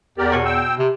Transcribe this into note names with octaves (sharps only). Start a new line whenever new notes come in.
E2 G4 A#4 D5
B2 C#5
G5 E6
C3